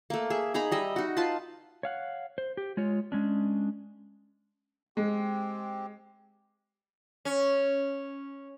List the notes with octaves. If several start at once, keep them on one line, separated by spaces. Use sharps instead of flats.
A3 A#3
G#4 E5
D#4 G#4 A#5 B5
G3 D#5 E5
D#4 F#4
F4 B4 A5 C6
C#5 F5 F#5
C5
G4
G#3 F4 C#5
G#3 C#4 D4
G#3 C4 G4
C#4